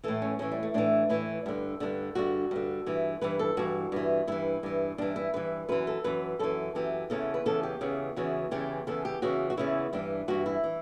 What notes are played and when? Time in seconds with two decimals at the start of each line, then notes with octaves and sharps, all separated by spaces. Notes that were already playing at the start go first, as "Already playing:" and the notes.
0.03 A2 E3 A4
0.22 C#4
0.39 A2 E3 C#4
0.52 G3
0.63 A3
0.74 A2 E3 D4
1.09 A2 E3 E4
1.46 G2 D3
1.80 G2 D3
2.15 G2 D3 F#4
2.51 G2 D3
2.86 G2 E3
3.21 G2 E3 B4
3.39 A4
3.57 G2 E3 F#4
3.92 G2 E3
4.28 G2 E3 E4
4.63 G2 E3
4.98 G2 E3 D4
5.16 E4
5.34 G2 E3 B4
5.69 F#2 E3 B4
5.87 A4
6.04 F#2 E3 B4
6.39 F#2 E3 A4
6.75 F#2 E3 G4
7.10 E2 C#3 E3 A4
7.34 B4
7.46 E2 C#3 E3 A4
7.63 G4
7.81 E2 C#3 E3
8.16 E2 C#3 E3 F#4
8.51 E2 C#3 E3 G4
8.87 E2 C#3 E3 A4
9.05 G4
9.22 E2 C#3 E3 F#4
9.50 F#4
9.57 E2 C#3 E3 E4
9.93 G2 E3 D4
10.28 G2 E3 F#4
10.46 E4
10.64 E3